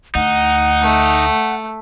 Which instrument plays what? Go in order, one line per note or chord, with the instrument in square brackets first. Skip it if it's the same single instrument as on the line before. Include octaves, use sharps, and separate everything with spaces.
[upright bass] D2 [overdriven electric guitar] D#4 [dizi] F#5
[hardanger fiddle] A3